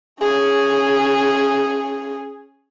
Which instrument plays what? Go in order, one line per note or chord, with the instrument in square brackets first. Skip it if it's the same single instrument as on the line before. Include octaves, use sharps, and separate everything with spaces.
[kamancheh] C#4 G#4